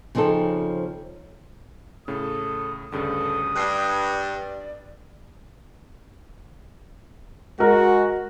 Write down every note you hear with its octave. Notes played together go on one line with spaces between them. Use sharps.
C#3 F3 C4 D#4 A4
A2 C#3 A4 D#6
D2 G2 C#3 A4 D#6
G2 D5 F#6 C7
G#3 F#4 A#4